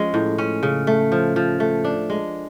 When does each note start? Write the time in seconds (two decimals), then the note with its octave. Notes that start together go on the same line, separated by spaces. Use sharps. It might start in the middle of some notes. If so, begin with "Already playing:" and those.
Already playing: F3 G#3 C#4
0.14 A2
0.38 C#4
0.63 C#3
0.87 A3
1.12 F3
1.36 F3
1.60 A3
1.84 D4
2.10 G#3